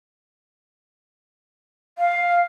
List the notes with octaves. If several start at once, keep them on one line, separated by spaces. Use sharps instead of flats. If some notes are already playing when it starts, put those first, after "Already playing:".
F5